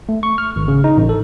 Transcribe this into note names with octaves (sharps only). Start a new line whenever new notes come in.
A3
C#6
F6
G#1
C#3
D#4
A1
A4